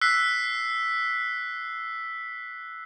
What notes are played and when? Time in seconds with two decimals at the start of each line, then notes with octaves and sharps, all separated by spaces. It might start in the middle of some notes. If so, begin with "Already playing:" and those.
0.01 E6 F#6 B6 C7